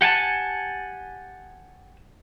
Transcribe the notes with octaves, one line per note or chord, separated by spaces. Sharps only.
G4 F#5 G#5 A5